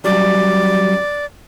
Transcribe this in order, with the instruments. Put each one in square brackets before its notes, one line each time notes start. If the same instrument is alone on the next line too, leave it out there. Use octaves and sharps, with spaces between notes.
[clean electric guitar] F#3 G3 C#4 [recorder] D5